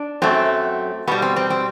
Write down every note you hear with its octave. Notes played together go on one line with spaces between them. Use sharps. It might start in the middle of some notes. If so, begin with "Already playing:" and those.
Already playing: D4
F#2 F#3 A3 C4
B2 G3 B3
C4
C4
C4